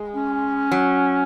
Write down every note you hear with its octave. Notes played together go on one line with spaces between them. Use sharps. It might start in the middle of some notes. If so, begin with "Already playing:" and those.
Already playing: G#3
C#4
F#3